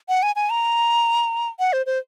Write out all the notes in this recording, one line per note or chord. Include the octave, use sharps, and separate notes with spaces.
F#5
G#5
G#5
A#5
F#5
C5
C5